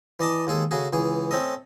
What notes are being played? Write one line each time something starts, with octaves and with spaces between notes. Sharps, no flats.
E3 D5 D#5 A5 D#6
D#2 G#3 G#4 A4
C#3 A3 F#4 G#4
C#2 E3 G#4
A3 C4 C#4 A4 D#5